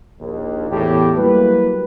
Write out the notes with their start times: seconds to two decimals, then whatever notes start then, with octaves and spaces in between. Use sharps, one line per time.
0.20 A#1 D#2
0.71 E2 A2 G4
1.17 F#3 G3 A#3 E4 B4